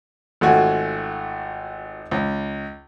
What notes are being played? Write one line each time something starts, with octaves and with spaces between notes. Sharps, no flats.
G#1 A3 F4 F#4 G#5
C#2